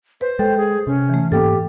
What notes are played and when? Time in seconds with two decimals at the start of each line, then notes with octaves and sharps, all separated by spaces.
0.21 B4 C5
0.39 G#3 A4 G5
0.57 G#4
0.87 C3 C#4
1.09 E3 A3
1.32 G#2 A#3 G4 A4 G5